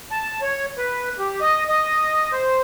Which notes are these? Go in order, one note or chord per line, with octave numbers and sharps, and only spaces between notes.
A5
C#5
B4
G4
D#5
D#5
C5